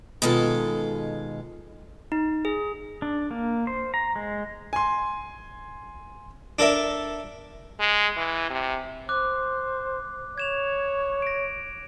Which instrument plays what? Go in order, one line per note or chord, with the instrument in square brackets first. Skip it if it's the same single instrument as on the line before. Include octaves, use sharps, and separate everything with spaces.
[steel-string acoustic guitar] B2 D#3 G#3 F4 A4
[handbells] D#4
G#4
[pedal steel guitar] D4
A#3
C5
A#5
G#3
[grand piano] G#5 C6
[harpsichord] D4 A4 A#4 E5
[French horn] G#3
E3
C3
[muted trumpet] C5 [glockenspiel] D6 F#6
[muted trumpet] C#5 [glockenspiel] G#6 E7 F7
[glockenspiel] A#6 D7